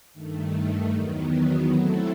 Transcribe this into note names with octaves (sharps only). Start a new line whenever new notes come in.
G2 D#3 A3
E2 D#3 F#3 B3
F#3 A3 C4 E4 A4